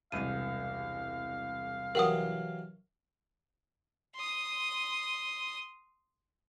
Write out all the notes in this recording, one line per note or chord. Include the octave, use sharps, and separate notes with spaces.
E1 C2 G#3 F5 D#7
E3 F#3 G4 A#4 F#5 D#6
C6 D#6